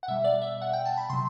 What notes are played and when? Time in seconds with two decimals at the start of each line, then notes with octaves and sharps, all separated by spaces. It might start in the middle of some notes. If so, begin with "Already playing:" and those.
0.03 F#5
0.08 B2 G3 E5
0.24 D5
0.42 E5
0.62 F#5
0.73 G5
0.85 A5
0.97 B5
1.10 C3 F#3 C6